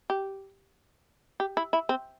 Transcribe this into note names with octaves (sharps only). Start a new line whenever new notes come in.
G4
G4
E4
E4
C4